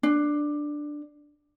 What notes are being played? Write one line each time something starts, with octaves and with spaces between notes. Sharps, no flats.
D4